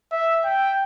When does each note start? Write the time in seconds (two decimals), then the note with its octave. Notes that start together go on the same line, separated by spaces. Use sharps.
0.12 E5
0.45 G5